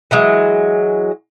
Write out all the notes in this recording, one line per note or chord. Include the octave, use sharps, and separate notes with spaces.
E3 F#3 G#3